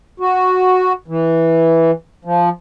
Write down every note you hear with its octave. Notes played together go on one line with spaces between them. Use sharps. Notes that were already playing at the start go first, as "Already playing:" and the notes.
F#4
E3
F3